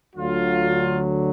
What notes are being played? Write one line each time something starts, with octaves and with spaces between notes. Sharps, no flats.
D2 D3 F#3 F4